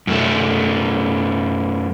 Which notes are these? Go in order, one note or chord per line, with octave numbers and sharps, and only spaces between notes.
F#2 A3